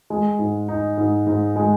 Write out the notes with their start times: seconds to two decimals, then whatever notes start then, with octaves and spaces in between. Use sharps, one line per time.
0.10 G#3
0.39 G#2
0.69 D#4
0.98 G#2
1.27 G#2
1.56 G#3